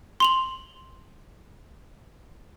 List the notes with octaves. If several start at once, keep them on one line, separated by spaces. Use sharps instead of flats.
C6 F7 F#7